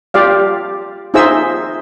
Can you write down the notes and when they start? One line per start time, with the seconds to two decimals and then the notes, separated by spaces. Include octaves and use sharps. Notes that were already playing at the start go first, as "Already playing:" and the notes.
0.14 F4 G4 D5 F5
1.14 D#4 F4 G#4 C5 E5 E6